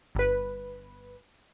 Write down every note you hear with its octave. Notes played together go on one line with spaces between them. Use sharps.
G1 B4